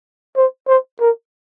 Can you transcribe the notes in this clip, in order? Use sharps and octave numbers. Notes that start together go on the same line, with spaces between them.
C5
C5
A#4